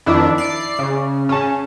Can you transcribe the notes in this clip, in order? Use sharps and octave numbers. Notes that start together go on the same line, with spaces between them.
F2 D#3 D4 E4
D5 C7
C#3
C#3 C#4 A5